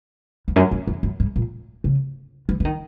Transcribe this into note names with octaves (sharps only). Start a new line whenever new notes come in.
E2
F#2
F#2
E2
F#2
G#2
A#2
C#3
E3
E3
D#3